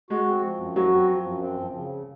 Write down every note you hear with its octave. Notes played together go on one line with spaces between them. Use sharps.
G#3 F#4
C4
F3
F#2
F#3 F#4
C4
F3
F#2
C4
F3
C#3